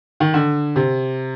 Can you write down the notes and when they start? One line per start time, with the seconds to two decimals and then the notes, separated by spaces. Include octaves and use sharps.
0.20 D#3
0.34 D3
0.76 C3